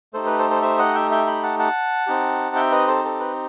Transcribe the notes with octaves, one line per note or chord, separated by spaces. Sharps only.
A3 D#4 G4 A4 C5
B4
A4 C5
A4 C5
C5 E5
D#5 F#5
E5 G5
E5 G5
G5 B5
F#5 A5
F#5 A5
C4 D#4 G4
E5 G5
B4 D#5
A4 C5
A4
B4